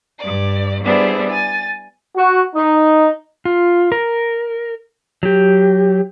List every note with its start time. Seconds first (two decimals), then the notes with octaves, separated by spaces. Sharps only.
0.20 G2 D5
0.84 G3 B3 D4 E4 G#4 C5
1.29 G#5 A6
2.16 F#4
2.56 D#4
3.45 F4
3.92 A#4
5.23 F#3 G4